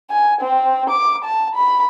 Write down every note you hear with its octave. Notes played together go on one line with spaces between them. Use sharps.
G#5
C4
D6
A5
B5